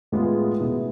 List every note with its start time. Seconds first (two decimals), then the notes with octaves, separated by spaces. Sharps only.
0.12 A2 G#3 B3 F4 G#4
0.60 B2 B3 E4